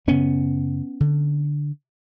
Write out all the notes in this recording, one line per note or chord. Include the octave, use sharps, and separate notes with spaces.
F#2 C#3 B3 C#4
D3